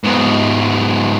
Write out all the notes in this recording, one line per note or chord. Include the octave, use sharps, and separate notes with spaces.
G#2 B3